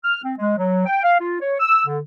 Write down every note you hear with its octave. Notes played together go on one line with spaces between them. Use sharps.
F6
C4
G#3
F#3
G5
F5
F4
C#5
E6
D3